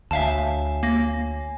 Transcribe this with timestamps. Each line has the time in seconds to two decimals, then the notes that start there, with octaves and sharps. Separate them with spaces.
0.11 D2 C#5 E5 F5 G#5 A5
0.83 A#3 A#6